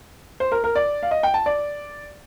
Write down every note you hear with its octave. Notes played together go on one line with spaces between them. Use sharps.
C5
A#4
A#4
D5
F5
D#5
G5
A5
D5